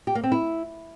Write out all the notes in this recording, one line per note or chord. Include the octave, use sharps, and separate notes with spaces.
G4
A#3
C4
E4